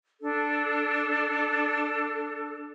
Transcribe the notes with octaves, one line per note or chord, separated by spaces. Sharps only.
D4 A4